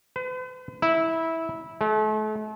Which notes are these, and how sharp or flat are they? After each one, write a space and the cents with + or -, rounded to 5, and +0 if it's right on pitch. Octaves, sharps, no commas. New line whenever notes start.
B4 +45
E4 -15
A3 -40